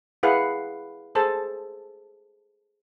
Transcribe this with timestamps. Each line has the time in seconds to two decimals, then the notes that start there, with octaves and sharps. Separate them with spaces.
0.23 E4 G#4 B4 F5 F#5
1.15 G#4 A4 C5 A5